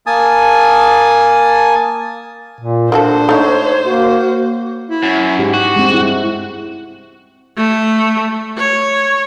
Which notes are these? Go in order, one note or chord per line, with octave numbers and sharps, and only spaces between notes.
A#3 G#5 A5 D#6
A#2
A#3 D4 F#4 A4 C5
A3 D#4 C#5
A#3 F#4
E4
F#2
G#2 G4
F#4
G2 G#3 C4
E4
A3
C#5